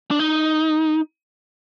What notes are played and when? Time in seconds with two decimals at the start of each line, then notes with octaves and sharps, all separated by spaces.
0.11 D4
0.19 D#4